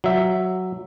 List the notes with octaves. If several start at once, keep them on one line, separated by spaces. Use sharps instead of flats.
F#3 E5